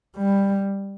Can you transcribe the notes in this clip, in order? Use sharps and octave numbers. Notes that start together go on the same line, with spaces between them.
G3